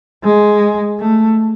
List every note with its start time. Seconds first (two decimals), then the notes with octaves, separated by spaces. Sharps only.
0.24 G#3
0.99 A3